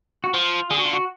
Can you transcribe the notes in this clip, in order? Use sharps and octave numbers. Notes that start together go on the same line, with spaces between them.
F#4
F3 F4
D3 G#4
F#4
F4
F#4